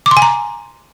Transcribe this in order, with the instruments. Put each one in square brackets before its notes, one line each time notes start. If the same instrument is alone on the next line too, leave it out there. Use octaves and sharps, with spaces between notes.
[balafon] D6
C6
G#5
A#5